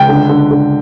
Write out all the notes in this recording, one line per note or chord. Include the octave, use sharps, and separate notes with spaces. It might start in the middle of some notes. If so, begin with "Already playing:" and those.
Already playing: C#2 G5
D3
D3
D3